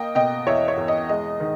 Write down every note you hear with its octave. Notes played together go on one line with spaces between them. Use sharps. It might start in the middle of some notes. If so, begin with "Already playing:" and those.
Already playing: A#3 D#5 G5
B2 D#5 G5
E2 C#5 E5
C#5
E2
D#5
G#3 D#5
D#3